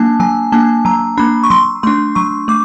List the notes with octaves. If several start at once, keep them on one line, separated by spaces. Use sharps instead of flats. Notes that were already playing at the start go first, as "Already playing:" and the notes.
Already playing: F#3 A#3 D4 G#5 A5
F#3 G#5
A#3 D4 A5
F#3 A#5
A#3 D4 B5
C#6
F#3 C6
A3 D4 C6
F#3 C#6
A3 D6